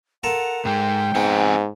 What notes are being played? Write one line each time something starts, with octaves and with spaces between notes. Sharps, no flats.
F4 A4 A#4 F#5
G#2 G#3 G5
G#2 B3 C4 F#5 G#5